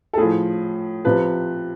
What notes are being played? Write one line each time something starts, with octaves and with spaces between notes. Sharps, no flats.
A4
A2 F3 G#4
C3 F3 B4